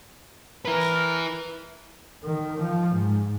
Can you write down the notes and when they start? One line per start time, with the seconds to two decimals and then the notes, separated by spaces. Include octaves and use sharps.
0.65 E4 A#4 B4
2.24 D#3
2.62 F3
2.96 G#2